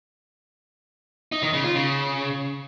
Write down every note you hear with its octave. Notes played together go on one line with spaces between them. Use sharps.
D#4
D#3
C#3
F4
C#3